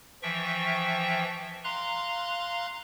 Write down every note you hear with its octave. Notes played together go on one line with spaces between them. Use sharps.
E3 F3 E5 G5 C#6
F5 A#5 C6 F#6